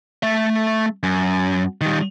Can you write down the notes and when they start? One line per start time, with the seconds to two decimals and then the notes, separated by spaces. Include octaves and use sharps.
0.23 A3 E5
1.03 F#2
1.81 D#3 G3